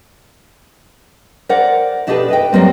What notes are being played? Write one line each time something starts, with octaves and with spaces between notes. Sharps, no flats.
A#4 C5 D5 F#5
B2 D4 D#4 G4 A4 B4
B4 D#5 G5
F#3 G3 A#3 C4